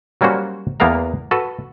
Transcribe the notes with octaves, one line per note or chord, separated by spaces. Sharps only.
F#3 G3 A#3 C#4 F#4 C5
E2 A#3 B3 A#4 F5 A#5
F#4 A4 B4